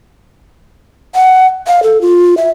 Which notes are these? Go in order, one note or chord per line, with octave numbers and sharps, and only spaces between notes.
F#5
F5
A4
F4
E5